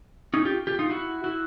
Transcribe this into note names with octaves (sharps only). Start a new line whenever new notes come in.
C#4 D#4
F4 G4
F4 G4
D#4 F4
E4 F#4
E4 F#4